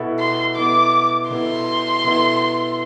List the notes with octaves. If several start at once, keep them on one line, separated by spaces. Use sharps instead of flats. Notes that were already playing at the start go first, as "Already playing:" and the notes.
Already playing: B2 B3 E4 A4
C6
B2 B3 E4 A4 D6
B2 B3 E4 A4 C6
B2 B3 E4 A4